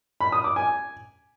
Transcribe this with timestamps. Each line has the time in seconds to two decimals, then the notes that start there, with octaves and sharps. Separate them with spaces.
0.21 B5
0.32 D#6
0.44 D6
0.56 G#5